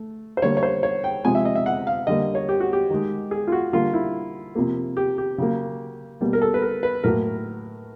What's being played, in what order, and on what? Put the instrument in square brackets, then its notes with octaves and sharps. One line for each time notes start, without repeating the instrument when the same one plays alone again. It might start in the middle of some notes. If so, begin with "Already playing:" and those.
Already playing: [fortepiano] A3
C5
D3 G3 A#3 C#5
C#5
C5
C#5
G5
C3 F3 G#3 G#5
E5
D#5
E5
F#5
F5
D3 G3 A#3 D#5
C#5
G4
F#4
G4
D#3 G#3
G#4
F4
F#4
D3 G3 A#3 F4
E4
C3 F3 A#3
G4
G4
C#3 F#3 A#3
B2 G3 A#3
A#4
A4
B4
A#4
B4
A2 F#3 A#3 A#4